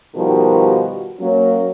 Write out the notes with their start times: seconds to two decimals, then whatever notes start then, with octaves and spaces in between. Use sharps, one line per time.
0.14 B2 D#3 F3 G3 F#4 G4
1.19 F#3 A#3 C#4